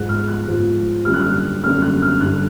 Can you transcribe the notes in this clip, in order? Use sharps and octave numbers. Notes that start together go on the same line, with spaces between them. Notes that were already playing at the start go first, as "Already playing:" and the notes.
Already playing: G#2 F3 G#3 F#6
F6
F#6
G#2 F3 G#3
F#2 D3 G3 A#3 C#4 F6
F#6
F6
F#2 D3 G3 A#3 C#4 F6
F#6
F6
G2 D3 G3 F#6